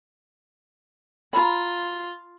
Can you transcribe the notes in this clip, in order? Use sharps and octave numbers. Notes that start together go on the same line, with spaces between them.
F4 A#5 B5